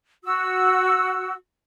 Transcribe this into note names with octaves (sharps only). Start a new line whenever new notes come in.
F#4 E6